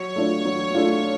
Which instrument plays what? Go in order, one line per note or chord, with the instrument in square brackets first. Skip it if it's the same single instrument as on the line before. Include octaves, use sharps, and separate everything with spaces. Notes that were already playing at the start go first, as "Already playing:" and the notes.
Already playing: [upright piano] F#3 [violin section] C#5
[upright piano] A3 D4 F4
F#3
A3 D4 F4